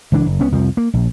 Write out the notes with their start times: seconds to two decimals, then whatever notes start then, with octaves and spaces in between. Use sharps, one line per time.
0.12 C#2 E3 F3 D4
0.26 F#1
0.41 C#2 B3 C#4
0.52 C2 F2 F3
0.77 A#3
0.94 A#1